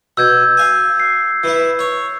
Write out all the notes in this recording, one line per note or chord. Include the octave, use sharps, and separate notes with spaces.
B2 E6 G6 G#6
F5 G#5
C7
E3 E4
C#5